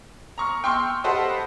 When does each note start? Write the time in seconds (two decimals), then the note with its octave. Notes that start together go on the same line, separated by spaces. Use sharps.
0.38 A#5 C#6 F6
0.64 G5 C6 C#6 E6 F6
1.04 G4 A4 B4 C5 D#5 F#5